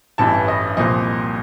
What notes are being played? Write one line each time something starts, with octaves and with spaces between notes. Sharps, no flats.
A1 G2 E3 A5
D#5
C2 A#2 F3 D#5